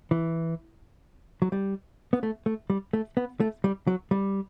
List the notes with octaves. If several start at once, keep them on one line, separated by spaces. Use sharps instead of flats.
E3
F#3
G3
B3
A3
A3
G3
A3
B3
A3
G3
F#3
G3